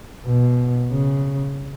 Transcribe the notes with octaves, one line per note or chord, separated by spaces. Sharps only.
B2
C#3